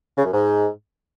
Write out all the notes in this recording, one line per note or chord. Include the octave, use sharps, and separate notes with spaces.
C#3
F#2
G#2